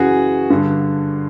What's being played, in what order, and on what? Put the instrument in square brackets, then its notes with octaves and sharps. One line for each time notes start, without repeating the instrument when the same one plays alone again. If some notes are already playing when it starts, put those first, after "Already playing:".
Already playing: [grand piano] F#2 C#3 E3 F#4 G#4
G2 D3